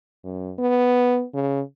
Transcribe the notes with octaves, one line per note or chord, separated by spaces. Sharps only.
F#2
B3
C#3